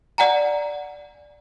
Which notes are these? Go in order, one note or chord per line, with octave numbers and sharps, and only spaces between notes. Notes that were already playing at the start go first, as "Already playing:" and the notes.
D5 F#5 G#5 A#5